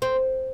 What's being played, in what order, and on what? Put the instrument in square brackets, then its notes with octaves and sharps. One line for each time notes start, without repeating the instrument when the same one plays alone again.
[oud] C4